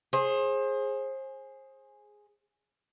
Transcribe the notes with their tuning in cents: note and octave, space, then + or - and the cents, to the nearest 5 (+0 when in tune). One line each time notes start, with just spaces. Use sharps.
G#4 +0 C5 +30